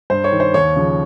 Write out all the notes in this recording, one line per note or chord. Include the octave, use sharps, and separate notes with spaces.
G2 C5
C#5
D#3
C5
D#2 C#5
C#3 F3